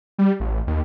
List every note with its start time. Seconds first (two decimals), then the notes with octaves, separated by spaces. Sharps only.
0.19 G3
0.40 A1
0.67 D#2